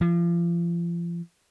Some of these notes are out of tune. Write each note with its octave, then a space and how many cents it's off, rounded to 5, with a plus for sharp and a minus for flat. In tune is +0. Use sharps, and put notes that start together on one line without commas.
F3 -35